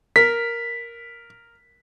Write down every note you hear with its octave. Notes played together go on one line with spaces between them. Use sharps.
A#4 B6